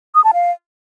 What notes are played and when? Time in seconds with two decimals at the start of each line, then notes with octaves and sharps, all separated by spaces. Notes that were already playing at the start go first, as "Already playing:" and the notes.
0.15 D#6
0.24 A5
0.34 F5